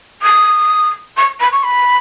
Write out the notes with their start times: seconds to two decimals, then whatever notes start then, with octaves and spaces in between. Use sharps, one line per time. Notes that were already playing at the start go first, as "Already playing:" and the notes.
0.22 D#6
1.16 C#6
1.40 B5
1.52 C#6
1.63 B5